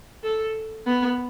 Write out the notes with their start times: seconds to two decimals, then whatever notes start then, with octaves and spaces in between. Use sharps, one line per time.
0.24 A4
0.86 B3